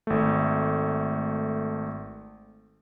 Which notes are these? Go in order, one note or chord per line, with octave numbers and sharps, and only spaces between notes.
G#1 A3